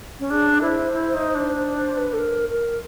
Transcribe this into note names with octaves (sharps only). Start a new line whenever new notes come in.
C#4
D4 G#4
E4 C5
E4
D#4
D4
C5
C5
B4
A4
A#4
A#4